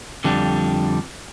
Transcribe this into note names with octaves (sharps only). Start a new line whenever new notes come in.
F2 D3 G3 D4